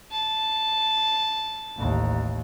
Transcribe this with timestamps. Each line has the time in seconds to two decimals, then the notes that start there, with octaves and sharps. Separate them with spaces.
0.12 A5
1.77 A1 D#2